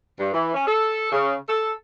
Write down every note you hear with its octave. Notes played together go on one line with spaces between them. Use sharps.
G2
E3
C#4
A4
C#3
A4